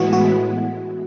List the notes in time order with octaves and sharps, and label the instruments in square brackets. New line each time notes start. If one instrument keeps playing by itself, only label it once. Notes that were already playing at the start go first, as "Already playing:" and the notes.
Already playing: [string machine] A2 E3 G#3 B3 E4 [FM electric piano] F#4
[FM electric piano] F#4